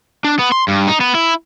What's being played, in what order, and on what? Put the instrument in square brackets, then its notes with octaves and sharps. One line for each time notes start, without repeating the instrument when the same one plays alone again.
[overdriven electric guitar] D4
B3
C6
G2
D#4
B3
E4